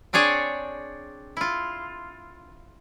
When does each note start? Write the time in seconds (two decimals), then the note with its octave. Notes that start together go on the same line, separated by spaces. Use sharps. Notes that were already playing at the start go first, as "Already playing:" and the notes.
0.13 C4 D4 G#4 C#5 D5 G#5
1.37 E4 F4